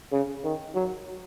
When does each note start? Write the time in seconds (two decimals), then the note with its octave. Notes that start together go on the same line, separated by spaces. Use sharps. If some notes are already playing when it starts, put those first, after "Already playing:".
0.12 C#3
0.44 D#3
0.75 F#3